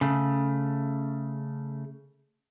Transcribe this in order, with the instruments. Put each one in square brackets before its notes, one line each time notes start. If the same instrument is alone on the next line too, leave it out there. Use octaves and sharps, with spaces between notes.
[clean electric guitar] C#3 A3